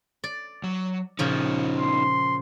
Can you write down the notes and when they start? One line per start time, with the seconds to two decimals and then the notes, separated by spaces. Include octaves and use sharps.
0.24 D5
0.64 F#3
1.19 A#2 C#3 F3 D#4 F4 F#4
1.79 C6